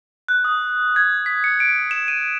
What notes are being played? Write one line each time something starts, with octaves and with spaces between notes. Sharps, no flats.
F#6
D#6
G#6
B6
C#7
D7
E7
D#7